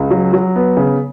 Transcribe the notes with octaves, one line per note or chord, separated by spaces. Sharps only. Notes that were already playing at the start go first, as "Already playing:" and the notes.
Already playing: C#2
F#3
F#3
B3
C#3